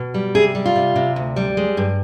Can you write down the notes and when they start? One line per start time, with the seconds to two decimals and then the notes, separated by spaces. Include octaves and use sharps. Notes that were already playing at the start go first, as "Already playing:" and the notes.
Already playing: B2
0.14 G3
0.35 C3 G#4
0.55 G3
0.66 F4
0.76 C3
0.96 C3
1.16 D2
1.36 G3
1.57 G#3
1.77 G2